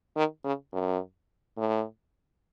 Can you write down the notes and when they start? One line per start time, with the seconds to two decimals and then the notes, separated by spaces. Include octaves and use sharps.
0.16 D#3
0.44 C#3
0.73 F#2
1.57 A2